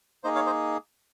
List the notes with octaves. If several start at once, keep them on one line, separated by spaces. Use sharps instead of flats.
A#3 D#4 G#4 C5 D#5
C#5 F5
C5 D#5